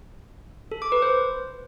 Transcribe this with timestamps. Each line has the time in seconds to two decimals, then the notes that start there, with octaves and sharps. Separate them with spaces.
0.71 A4
0.82 D6
0.92 B4
1.02 C5